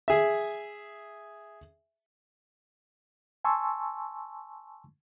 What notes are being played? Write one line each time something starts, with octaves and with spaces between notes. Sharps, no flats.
G#4 E5
G#5 A5 C6 C#6 E6